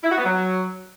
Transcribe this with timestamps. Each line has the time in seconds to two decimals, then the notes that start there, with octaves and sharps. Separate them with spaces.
0.04 E4
0.11 F#4
0.18 B3
0.25 F#3